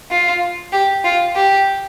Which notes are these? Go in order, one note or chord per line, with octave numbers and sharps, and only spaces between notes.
F4
G4
F4
G4